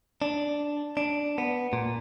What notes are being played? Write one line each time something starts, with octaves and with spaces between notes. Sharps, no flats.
D4
D4
B3
A#2